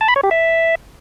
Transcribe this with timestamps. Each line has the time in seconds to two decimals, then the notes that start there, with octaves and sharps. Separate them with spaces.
0.01 A5
0.08 B5
0.16 C#5
0.23 G4
0.31 E5